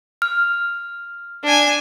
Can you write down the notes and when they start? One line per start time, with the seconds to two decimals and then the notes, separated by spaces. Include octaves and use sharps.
0.22 F6
1.44 D4 G#5